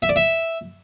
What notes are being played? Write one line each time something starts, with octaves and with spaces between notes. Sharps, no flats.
E5
D5
E5